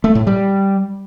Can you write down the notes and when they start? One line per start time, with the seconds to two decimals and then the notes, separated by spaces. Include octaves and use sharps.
0.04 A3
0.15 A2
0.27 G3